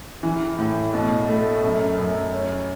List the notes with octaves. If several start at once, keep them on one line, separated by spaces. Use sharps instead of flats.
E3
A2
B2
A3
F#2
F#2
C#4